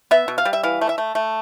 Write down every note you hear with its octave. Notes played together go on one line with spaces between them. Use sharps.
B3 E5
B2
F5
G3
E5
E3 F5
A3
E5
A3
A3